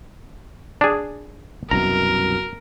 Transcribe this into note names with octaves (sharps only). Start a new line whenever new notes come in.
D4 G#4
C2 F#2 B2 A#4 A#5